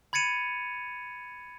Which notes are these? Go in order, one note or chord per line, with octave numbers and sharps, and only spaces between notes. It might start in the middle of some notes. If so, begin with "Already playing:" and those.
B5 G#6 A6 C#7 D#7 F7